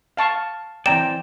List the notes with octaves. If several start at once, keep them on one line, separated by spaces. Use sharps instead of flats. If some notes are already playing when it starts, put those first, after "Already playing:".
F5 A5 C#6
E3 C4 D5 G5 A#5 E7